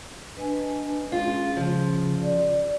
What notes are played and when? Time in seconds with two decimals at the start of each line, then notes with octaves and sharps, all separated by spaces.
0.37 D4 B4 D#5 G#5
1.12 G#3 C#4 F4 G#4
1.57 C#3 F3
2.20 D5